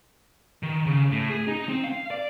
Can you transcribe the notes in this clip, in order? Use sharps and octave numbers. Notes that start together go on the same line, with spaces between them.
D#3
C#3
A2
G#4
D#4
C4
F5
D5